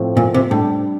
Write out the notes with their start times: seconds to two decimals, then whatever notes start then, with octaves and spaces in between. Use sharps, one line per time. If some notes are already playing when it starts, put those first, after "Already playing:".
Already playing: A2 F3 A3 C4
0.17 A#2
0.34 C3
0.50 A2 G3 D4 G4